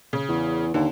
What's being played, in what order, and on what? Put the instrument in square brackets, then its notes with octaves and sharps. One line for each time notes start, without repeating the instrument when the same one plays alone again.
[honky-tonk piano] C#3
[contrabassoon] E2
[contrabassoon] D#2 [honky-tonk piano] D3